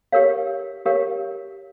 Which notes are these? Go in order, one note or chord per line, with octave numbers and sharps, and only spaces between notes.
G4 A#4 C#5 F5
G4 A#4 C#5 F5